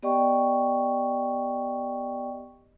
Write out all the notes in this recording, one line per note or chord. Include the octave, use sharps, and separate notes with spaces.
B3 G4 D5 D#5 G5 C#6